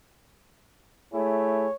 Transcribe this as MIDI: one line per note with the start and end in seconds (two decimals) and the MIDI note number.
1.14 1.66 57
1.14 1.66 64
1.14 1.66 68
1.14 1.75 73